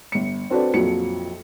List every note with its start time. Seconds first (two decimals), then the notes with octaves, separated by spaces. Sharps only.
0.12 G1 C#7
0.50 C4 D4 F#4 A4 B4 D5
0.74 A#1 F2 F3 F#3 C#7